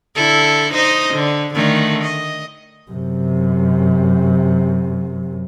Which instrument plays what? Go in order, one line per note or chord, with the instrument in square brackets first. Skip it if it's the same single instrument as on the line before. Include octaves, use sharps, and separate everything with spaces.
[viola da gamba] D3 E4 A4
D#4 C5 D#5
D3
D3 D#3 A3
D#5
[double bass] F#2 C3